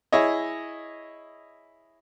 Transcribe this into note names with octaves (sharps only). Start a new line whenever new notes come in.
E4 G#4 C#5 D#5